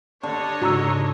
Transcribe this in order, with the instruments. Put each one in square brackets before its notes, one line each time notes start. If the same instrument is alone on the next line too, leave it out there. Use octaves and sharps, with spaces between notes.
[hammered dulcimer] D3 [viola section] D4 C#5 D#5
[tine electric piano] G#2 C#3 [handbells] F#4 A#5 E6